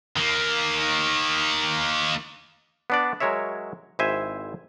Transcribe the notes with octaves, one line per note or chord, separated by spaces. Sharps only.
D#3 A#3
B3 D4 D5
F#3 G#3 A#4 C#5 E5
G#1 E4 C5 E5 G#5